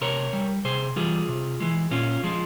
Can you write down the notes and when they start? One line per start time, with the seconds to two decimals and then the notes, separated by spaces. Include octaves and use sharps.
0.01 C3 A#4 C#5
0.33 G3
0.65 C3 G#4 C5
0.96 E3 G3 F4 G#4
1.28 C3
1.60 E3 G#3
1.91 A#2 C#4 F4
2.24 F3 G#3